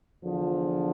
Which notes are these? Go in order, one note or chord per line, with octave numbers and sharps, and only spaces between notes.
E2 D3 F3